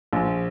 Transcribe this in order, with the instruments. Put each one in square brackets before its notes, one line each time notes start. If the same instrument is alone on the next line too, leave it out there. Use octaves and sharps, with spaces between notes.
[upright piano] A#1